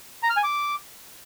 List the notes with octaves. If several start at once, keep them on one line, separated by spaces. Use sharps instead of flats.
A#5
F6
G#5
D6